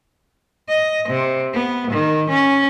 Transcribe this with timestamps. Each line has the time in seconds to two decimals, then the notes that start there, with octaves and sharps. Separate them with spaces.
0.69 D#5
1.09 C3
1.54 B3
1.91 D#3
2.30 C#4